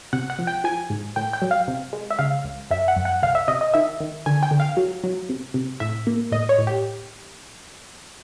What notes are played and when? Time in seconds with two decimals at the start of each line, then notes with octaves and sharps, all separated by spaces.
0.13 C3 F#5
0.30 F#5
0.39 F3
0.47 G5
0.64 F3 G#5
0.90 G#2
1.16 A2 G5
1.33 G5
1.42 F#3
1.51 F5
1.68 C3
1.93 G#3
2.10 E5
2.19 C#3 F5
2.44 C#2
2.70 F#2 E5
2.88 F#5
2.96 F#2
3.05 F#5
3.23 C2 F5
3.35 E5
3.48 C3 D#5
3.61 D#5
3.74 D#3 E5
4.00 D#3
4.26 D3 G#5
4.43 G5
4.51 D3
4.60 F5
4.77 F#3
5.04 F#3
5.29 C3
5.54 C3
5.80 A2 E5
6.07 A#3
6.32 A2 D#5
6.49 C#5
6.58 A2
6.67 G4